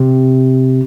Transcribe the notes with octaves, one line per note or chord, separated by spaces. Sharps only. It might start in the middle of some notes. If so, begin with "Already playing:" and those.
Already playing: C3